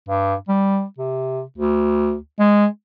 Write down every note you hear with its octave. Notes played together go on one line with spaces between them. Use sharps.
G2
G3
C3
D2
G#3